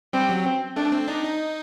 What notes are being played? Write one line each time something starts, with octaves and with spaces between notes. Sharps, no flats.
G3 C4
F#3
C4
A3 D4
C4
D4 D#4
D#4